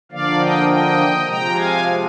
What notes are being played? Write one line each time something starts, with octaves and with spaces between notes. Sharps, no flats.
D3 F3 A#3 D5 F5
D#5 G5
D#5 G5
C3 F3 G#3 G5 A#5
F5 G#5